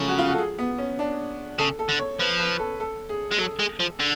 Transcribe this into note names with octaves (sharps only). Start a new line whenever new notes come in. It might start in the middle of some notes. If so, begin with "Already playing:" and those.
Already playing: C#3 F3 F#3 G#3 A3
F#4
F4
F#4
A4
G#4
B3
C#4
D4
C#3 A4
A4
D3
C#5
F3 B4
B4
A4
A4
G#4
G#3
F#3 A4
G#3
F3
D3